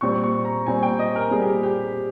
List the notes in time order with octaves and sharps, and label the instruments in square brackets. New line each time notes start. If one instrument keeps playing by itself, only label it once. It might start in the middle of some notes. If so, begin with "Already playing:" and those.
[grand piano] A#2 G3 C4 [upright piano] C#6
[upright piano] C#6
A#5
[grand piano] A#2 G3 C4 [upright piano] G#5
[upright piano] G5
D#5
A#4
[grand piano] A#2 G3 C4 [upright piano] G#4
[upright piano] G4
G4